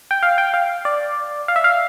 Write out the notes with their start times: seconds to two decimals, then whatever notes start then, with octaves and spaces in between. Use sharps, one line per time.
0.11 G5
0.23 F5
0.38 G5
0.54 F5
0.85 D5
1.48 F5
1.56 E5
1.64 F5